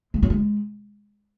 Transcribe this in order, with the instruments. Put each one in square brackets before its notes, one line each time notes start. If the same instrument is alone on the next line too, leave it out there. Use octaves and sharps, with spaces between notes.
[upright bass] G#3
F#3
G#3